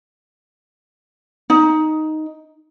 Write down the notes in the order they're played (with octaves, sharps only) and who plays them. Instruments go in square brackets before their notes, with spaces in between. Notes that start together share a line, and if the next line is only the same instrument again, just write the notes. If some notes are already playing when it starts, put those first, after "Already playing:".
[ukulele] D#4